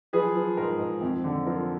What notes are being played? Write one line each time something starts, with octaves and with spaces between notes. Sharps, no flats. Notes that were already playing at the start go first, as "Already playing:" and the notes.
F3 G#4 B4
F3
G#2 A#4
G#2
F2
D3
F3 A#4